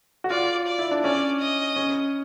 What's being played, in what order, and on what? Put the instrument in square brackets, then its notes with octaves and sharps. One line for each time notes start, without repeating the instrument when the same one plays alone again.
[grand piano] F#4
[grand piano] F4 [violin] D5
[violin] D5
[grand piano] E4
D4
[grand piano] C#4 [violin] D5
[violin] D#5
[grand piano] C#4